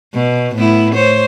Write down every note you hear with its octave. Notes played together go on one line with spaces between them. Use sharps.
B2
A2 B3 E4
C5 C#5